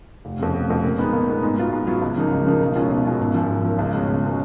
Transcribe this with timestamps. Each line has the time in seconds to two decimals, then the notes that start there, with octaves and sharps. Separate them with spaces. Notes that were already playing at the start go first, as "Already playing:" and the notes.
0.25 F1
0.39 F2 C#3
0.54 F1
0.69 F2 C#3
0.84 A#2
0.98 G#3 B3 D#4
1.13 A#2
1.28 G#3 B3 D#4
1.43 G#2
1.58 F#3 B3 F4
1.72 G#2
1.87 F#3 B3 F4
2.02 C#2
2.16 C#3 F3 A#3 D#4
2.31 C#2
2.46 C#3 F3 A#3 D#4
2.60 B1
2.75 B2 G#3 C#4 F4
2.90 B1
3.05 B2 G#3 C#4 F4
3.20 G#1
3.34 F#2 F3
3.49 G#1
3.64 F#2 F3
3.79 C#2
3.94 B2 G#3 C#4
4.08 C#2
4.23 B2 G#3 C#4